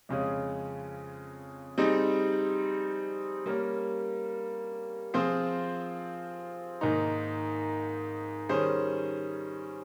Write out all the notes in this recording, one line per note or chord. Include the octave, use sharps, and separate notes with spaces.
F2 C#3 G#3 C#4 G#4
G3 C4 D#4 G#4
G3 A#3 C#4 G4 A#4
F3 C4 F4 G#4 C5
G#2 D#3 A#3 D#4
D#3 G3 C#4 G#4 C5